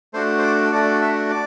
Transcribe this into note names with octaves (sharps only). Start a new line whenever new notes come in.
A3 D4 F#4 C5
C5
D5
A3 D4 F#4 D5
E5
D5